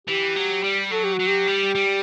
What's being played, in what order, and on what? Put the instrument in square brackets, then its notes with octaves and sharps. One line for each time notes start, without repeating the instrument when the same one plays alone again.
[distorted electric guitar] E3 [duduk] G4
[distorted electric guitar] F#3
G3
[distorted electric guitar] F#3 [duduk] A4
[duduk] G4
[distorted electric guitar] F#3 [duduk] F#4
[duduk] G4
[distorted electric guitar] G3
G3